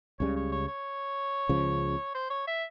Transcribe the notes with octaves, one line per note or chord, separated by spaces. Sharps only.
C#2 C#3 G3 C#5
C#5
C#5
C#5
C#2 C#3 F3
C5
C#5
E5